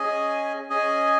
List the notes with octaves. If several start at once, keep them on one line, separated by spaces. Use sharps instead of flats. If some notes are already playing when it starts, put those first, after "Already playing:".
Already playing: C#4 G#4 D#5 G#5
C#4 G#4 D#5 G#5